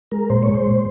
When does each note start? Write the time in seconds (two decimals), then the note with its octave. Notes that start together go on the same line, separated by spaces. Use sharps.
0.12 G#3 A#4
0.30 A#2 C5
0.43 G#3 C#5
0.55 C5
0.67 A#2